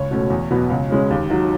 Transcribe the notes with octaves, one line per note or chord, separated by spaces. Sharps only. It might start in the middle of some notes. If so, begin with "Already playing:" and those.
Already playing: C#2 C#5
B2 A3 C#4
E2
B2 F#3 B3
C#2
C#3 G#3 C#4
D#2
D#3 F#3